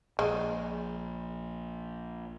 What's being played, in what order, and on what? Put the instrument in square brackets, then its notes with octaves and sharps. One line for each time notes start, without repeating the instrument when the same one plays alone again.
[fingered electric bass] A#1 [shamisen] G#3